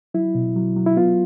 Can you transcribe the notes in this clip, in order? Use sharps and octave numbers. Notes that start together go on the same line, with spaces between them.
F#3 E4
B2
F#3
F#3
E4
B3 F4